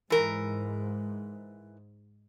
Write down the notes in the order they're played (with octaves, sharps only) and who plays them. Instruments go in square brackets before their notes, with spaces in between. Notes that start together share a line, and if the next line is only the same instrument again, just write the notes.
[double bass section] G#2 [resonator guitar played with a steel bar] E3 A#4